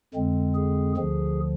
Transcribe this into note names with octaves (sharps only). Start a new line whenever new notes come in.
F2 D3 G#3 C4
G#4
D2 D3 F3 G#4